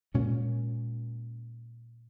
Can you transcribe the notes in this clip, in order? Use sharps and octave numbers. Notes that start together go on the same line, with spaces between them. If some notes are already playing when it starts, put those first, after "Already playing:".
A#2 G#3 C#4